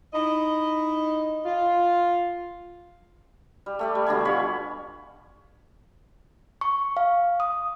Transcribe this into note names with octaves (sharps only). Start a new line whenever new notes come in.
D#4 E4 D#5
F4
G3
A3 G4 D5
G3
B2 D3 G3 G#5
F4 C#5 B5
C#6
F5
D#6